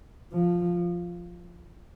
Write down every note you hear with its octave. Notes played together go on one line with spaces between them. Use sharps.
F3